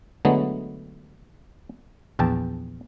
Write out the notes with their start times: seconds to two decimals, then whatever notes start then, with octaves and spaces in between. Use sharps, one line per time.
0.25 D3 F#3 G#3 A3 B3
2.19 A#1 E2 G5 A5